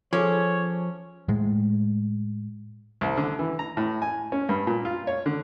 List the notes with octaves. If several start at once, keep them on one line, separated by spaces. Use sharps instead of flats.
F3 C#4 G#4 A4 C#5 D6
A2 G#3
C2
D3
E3
A#5
A2
G#5
C#4
G2
A#2
F4
C#5
D3